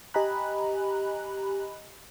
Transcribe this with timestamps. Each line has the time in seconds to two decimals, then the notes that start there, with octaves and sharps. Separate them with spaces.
0.14 G4 D#5 G#5 A#5 B5 F#6